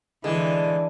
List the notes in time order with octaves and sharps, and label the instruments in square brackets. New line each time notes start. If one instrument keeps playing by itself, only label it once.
[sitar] D3 [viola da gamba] E3 [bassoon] G#3